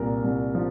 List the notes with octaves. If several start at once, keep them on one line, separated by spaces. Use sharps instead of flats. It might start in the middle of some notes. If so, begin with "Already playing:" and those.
Already playing: C2 A#2 A#4
C2
F3